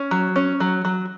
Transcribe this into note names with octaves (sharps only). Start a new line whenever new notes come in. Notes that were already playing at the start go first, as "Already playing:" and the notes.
Already playing: C#4
F#3
C#4
F#3
F#3